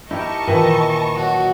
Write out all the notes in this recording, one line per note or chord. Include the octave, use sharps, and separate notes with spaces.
D#4 E4 G4 A#4 D#5 A5 C#6
A#2 D#3 E3 G#5 B5 E6
F#3 F#4